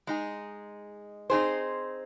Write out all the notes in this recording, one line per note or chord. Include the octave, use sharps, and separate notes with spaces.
G#3 D#4 G#4
C4 D#4 G#4 C5